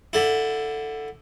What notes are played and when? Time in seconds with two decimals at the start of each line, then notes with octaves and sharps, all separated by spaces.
0.13 D3 E4